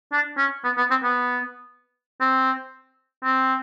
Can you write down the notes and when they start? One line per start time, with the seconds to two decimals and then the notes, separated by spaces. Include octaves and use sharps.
0.12 D4
0.37 C#4
0.64 B3
0.77 B3
0.91 C4
1.03 B3
2.20 C4
3.24 C4